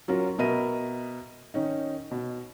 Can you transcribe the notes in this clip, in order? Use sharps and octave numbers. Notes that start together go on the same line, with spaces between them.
F#3 C#4 F4 F#4 A#4
B2 B3 A#4 D#5 E5 D#7
D#3 C#4 D#4
B2